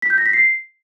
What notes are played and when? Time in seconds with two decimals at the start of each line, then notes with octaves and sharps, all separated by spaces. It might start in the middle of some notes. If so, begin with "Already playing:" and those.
0.02 B6
0.10 G6
0.18 A#6
0.26 B6
0.33 C7